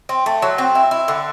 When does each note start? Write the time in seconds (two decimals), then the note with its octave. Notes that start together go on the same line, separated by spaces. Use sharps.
0.09 C4
0.26 A3
0.42 F#3
0.58 C4
0.75 E4
0.91 E4
1.08 D3